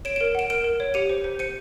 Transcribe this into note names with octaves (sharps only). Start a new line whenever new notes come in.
C#5 D7 E7
A#4 D7 E7
F#5 D7 E7
A#4 D7 E7
A#4
C#5
G4 C#7 D#7
C5
C5
C5 C#7 D#7